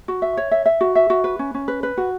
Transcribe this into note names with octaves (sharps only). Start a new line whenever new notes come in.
F#4
E5
C#5
E5
E5
F#4
E5
F#4
B4
C#4
C#4
B4
B4
F#4